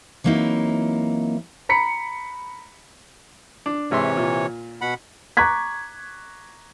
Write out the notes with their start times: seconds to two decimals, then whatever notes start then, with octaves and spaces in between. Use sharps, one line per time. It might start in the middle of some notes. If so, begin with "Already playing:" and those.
0.24 E3 F#3 A#3 C4 D#4 E4
1.69 A#5 B5 B6 C#7
3.66 D4
3.91 G#1 C3 E3 C#5 E5 C6
4.17 A#2
4.81 B2 F#5 B5
5.37 A#5 C#6 D6 F#6 G#6 B6